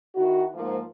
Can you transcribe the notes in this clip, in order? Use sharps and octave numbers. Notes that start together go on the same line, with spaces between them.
D#3 E4 F#4
G#2 F3 A#3